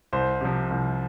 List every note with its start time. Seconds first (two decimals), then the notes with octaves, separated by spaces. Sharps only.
0.13 C2 C5
0.41 C3 F3
0.70 C2